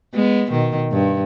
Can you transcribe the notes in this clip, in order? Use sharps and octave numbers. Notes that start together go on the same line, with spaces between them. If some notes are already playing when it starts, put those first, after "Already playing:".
G#3 B3
B2 D#3
G2